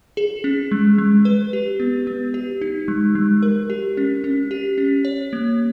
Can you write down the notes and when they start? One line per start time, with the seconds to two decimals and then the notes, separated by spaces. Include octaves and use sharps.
0.17 G#4
0.44 C#4
0.71 G#3
0.98 G#3
1.25 B4
1.53 G4
1.80 B3
2.07 B3
2.34 G4
2.62 D#4
2.88 G#3
3.15 G#3
3.43 A#4
3.70 G4
3.97 C#4
4.24 C#4
4.51 G4
4.78 C#4
5.05 C#5
5.33 A#3